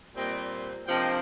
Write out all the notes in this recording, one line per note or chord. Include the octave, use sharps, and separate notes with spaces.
A#2 G3 C4 D#5 G5
C3 F3 A#3 D4 D#5 G5